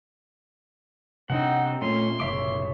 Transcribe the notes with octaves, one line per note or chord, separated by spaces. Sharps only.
C3 C4 D4 D#4 F#5
A#2 A3 C#4 C6
F#1 C2 A#2 C#5 E5 D6